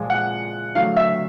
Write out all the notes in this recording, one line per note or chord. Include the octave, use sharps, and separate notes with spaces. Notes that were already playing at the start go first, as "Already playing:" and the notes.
Already playing: A#2 F3 G#3
F#5
D3 F#3 A3 F5
E5